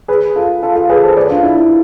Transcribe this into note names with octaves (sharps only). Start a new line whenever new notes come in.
G#4 B4
F4 A4
F4 A4
F4 A4
G#4 B4
A4 C5
B4 D5
D4 F4
E4
E4